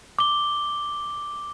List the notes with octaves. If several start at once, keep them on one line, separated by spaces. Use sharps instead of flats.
D6 G7